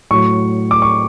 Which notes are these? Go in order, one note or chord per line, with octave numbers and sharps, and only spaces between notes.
A2 F#3 C#6
D6
C#6